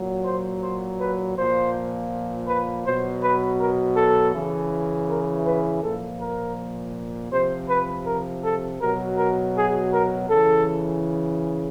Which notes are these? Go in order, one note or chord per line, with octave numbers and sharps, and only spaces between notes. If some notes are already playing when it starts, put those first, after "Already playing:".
Already playing: A#2 F#3
C5
C5
B4
A#2 F3 C5
B4
B2 F#3 C5
B4
A#4
A4
C#3 E3
A#4
B4
A#2 F3 A4
A#4
C3 F3 C5
B4
A#4
A4
B2 F#3 A#4
A#4
G#4
A#4
C#3 E3 A4